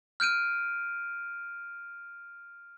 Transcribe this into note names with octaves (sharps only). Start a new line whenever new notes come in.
F6 G6 D7 D#7